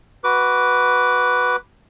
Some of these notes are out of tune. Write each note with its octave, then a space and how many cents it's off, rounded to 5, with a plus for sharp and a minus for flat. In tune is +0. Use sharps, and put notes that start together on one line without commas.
F#4 +0 B4 +0 D6 -15